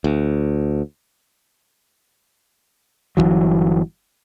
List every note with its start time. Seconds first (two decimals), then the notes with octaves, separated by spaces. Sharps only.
0.04 D2
3.17 G1 E2 E3 F#3